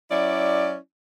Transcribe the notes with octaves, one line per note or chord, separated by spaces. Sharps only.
F#3 C#4 E4 D5